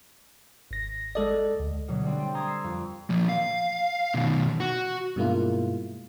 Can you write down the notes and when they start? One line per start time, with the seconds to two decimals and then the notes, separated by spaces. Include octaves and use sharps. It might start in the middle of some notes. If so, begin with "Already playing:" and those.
0.71 G#1 A#6
1.15 G#3 A4 D5 D#5
1.59 D2
1.88 B2 D3 F#3
2.04 G3 A3 C4 D4
2.19 G5
2.34 A5 A#5 C6 D#6 G#6 A#6
2.47 E6 C7
2.64 F2
3.10 F3 A#3
3.29 F5
4.14 B2 D#3
4.60 F#4
5.16 G2 B2 G#3 A#3 E4 F4